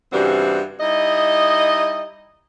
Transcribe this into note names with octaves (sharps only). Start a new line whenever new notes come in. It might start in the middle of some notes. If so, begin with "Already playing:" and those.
G2 C#3 E3 G3 C4 F#4
G3 D#4 E4 D#5